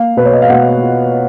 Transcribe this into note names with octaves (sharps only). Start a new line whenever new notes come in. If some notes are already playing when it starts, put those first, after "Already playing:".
Already playing: A#3 F5
B2 B4
C#5
D#5
F5
B2 F#5
F4